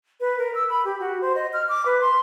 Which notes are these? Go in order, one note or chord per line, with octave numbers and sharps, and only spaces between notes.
B4
A#4
E6
B5
G4
F#4
C5
D#5
F6
D6
B4
C6